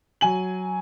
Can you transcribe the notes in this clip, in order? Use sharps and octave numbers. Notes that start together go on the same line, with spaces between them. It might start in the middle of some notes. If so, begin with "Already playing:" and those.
F#3 G#5 F#7